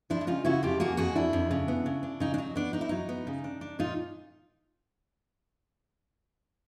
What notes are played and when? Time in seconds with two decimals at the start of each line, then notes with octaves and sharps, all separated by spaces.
0.10 F3 D4 E4
0.21 E4
0.27 C#3 D#4 F4
0.45 C#3 E4 F#4
0.63 F2 F4 G4
0.80 A#3 F#4 G#4
0.97 F2 F#4 G#4
1.16 F2 D4 E4
1.33 F2
1.51 C#3
1.68 B3
1.86 C#3
2.03 D4
2.20 C#3 D#4
2.34 D4
2.38 F#3 D#4
2.55 B3 D4
2.73 B3 D#4
2.81 E4
2.89 F#3 D#4
3.09 B3
3.27 C#3
3.44 D4
3.61 D4
3.79 A#2 D#4 F4